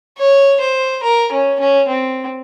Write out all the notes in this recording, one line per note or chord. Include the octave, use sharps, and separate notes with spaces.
C#5
C5
A#4
C#4
C#4
C4